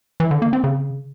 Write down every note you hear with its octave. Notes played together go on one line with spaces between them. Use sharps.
E3
D3
A#3
C4
C#3